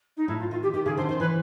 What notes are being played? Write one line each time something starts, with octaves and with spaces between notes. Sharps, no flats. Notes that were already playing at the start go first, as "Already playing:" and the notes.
D#4
A2 E4
F4
D#3 F4
G4
D#3 G4
C#3 G#4
D3 C5
D#3 C5
E3 B4